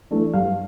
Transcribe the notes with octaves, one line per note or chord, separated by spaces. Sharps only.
E3 A3 D4
G2 F5